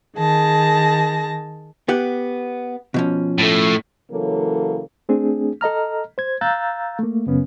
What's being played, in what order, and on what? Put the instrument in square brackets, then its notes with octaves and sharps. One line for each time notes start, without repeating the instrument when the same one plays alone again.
[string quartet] D#3 G#4 A5 A#6
[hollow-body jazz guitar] B3 G4 F#5
B2 F3 C#4
[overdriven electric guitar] A2 A3
[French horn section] C#3 E3 F#3 A#3 A4
[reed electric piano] A3 C4 D4 G#4
A4 D#5 A#5 F6
C5 G#6
F5 A#5 E6 F#6 G6 A6
A3 A#3
F#2 C#3 B3 C#4